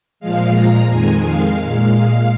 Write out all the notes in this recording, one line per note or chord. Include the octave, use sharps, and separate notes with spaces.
A#2 F3 G#3 F5
A#5
F2 D#3 G#3 G#5
F5
A#2 G#3 F5
F5